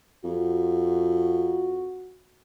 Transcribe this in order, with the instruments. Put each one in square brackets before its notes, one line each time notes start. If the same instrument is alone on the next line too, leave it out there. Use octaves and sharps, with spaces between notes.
[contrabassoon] F2 [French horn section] F#4